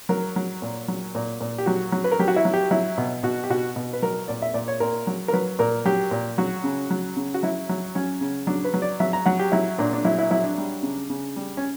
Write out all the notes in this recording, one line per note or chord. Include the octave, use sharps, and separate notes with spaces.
F#3 A#4
F#3
A#2
F#3
A#2
A#2
G4
F#3 F#4
F#3
B4
A#4
F#3 G4
F#4
E4
F#3
G4
F#3 E4
B2
B2 F#4
G4
B2 F#4
B2
B4
F#3 A#4
A#2 D5
E5
A#2 D5
C#5
A#2 A#4
F#3
A#4
F#3 B4
A#2 A#4
F#3 G4
A#2
F#3 F#4
C#3
F#3
C#3
F#4
F#3 E4
F#3
F#3 C#4
C#3
F#3 D4
B4
F#3
D5
F#3 E5
A#5
F#3 F#5
G4
F#3 E4
A#2 D4
D4
F#3 E4
E4
F#3 E4
D4
G3
C#3
C#3
G3
C#4